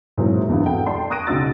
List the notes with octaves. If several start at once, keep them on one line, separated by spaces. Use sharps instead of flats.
G#2 C3 E3 F#3 A#3 C4
G#1 E2 G2 F#4
A4 F#5 G5
D5 G5 A5 C6
C#6 D#6 F#6 A#6 D7 D#7
B1 C#3 D#4 F#4 E6 A6